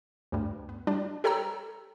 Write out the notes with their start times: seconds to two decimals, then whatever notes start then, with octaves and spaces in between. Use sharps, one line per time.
0.32 D2 G2
0.69 B3
0.87 G3 D4
1.24 G4 A4 C#5 G5 A#5 E6